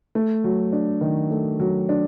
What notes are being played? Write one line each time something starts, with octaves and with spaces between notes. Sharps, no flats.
A3
F#3
D4
D#3
A3
F#3
D4